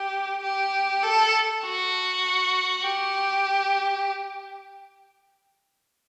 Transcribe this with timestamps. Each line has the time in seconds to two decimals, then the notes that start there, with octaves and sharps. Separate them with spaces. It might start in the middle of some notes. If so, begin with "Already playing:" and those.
Already playing: G4
0.43 G4
1.03 A4
1.64 F#4
2.83 G4